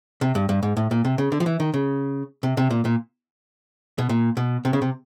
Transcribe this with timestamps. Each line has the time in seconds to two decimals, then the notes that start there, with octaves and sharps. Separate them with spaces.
0.21 C3
0.35 G2
0.49 G2
0.63 G#2
0.77 A2
0.91 A#2
1.05 C3
1.18 C#3
1.32 D3
1.40 F3
1.46 E3
1.60 D#3
1.74 C#3
2.43 C3
2.57 C3
2.70 A#2
2.85 A#2
3.98 B2
4.09 A#2
4.37 B2
4.65 C3
4.73 C#3
4.82 C3